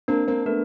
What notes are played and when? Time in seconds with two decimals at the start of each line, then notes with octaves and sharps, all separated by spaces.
0.08 A#3 C4 D4
0.28 A#3 C4
0.46 A3 B3 A#4